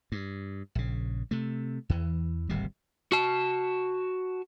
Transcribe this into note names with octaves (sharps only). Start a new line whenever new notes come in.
G2
A#1 C#3
C3 A3
E2 E3
D1 G#1 C3 G3
F#4 A5